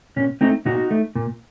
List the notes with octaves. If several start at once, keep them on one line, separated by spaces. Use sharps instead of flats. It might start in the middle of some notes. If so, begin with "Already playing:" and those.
A#2 C#4
A3 C4 D#4
A#2 D#4 F#4
A3
A#2